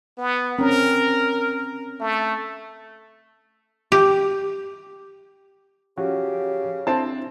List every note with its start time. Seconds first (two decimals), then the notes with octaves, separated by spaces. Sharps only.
0.18 B3
0.59 C4 C#4 A#4
2.00 A3
3.92 G4
5.98 C#3 F3 C#4 F#4 G4
6.87 C4 D4 E4 A5